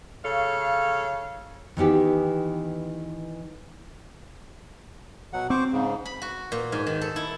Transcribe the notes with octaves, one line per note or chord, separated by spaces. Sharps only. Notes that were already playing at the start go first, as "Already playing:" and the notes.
C#3 A4 C#5 F5
D#3 E3 B3 G4
B2 F#3 F#5
C4 C5 C#6 D6
G#2 C#3
B5
F#4
A#2
G#2
D#3
A4
E4